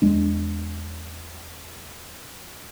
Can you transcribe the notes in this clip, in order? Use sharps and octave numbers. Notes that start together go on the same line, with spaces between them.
E2 G#3 D4